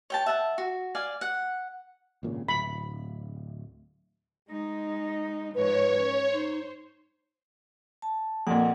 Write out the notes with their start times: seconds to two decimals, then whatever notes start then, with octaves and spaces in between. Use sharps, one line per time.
0.10 C#5 G5 A5
0.26 E5 F#5 A5
0.58 F#4
0.95 D5 F5 G#5
1.21 F#5
2.23 G#1 A#2 C#3
2.49 D1 B5
4.49 G#3 D#4
5.55 G#2 F3 B4 C#5
5.96 C#4
6.33 D#4 C5
8.02 A5
8.47 F2 A#2 F#5